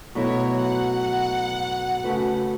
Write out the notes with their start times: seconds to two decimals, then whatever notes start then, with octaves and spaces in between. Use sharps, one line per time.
0.15 B2 F#3 A3 E4 C#5
0.62 F#5
2.04 C#3 A3 F#4 B4